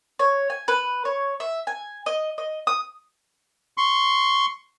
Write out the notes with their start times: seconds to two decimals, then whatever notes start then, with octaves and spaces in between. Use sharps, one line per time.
0.19 C#5
0.50 G#5
0.68 B4
1.05 C#5
1.40 E5
1.67 G#5
2.06 D#5
2.38 D#5
2.67 D#6
3.77 C6 C#6